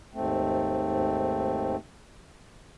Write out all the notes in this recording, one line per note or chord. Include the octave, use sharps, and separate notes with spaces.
D#2 G#2 A3 C4